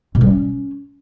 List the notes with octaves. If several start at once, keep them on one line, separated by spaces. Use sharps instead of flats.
B2
G3
C#4